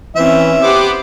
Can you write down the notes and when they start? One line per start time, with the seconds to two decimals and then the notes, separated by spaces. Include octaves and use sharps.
0.16 E3 C4 C#4 E5
0.63 B3 G4 C5 D6